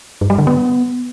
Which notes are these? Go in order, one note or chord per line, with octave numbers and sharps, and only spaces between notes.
G2
G3
D3
B3